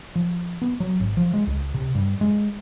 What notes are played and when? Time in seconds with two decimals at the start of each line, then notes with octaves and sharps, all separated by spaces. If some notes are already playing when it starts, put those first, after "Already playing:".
0.16 F3
0.62 B3
0.80 F#3
1.00 G#1
1.17 F3
1.34 G#3
1.47 C#2
1.74 C3
1.95 G2
2.21 G#3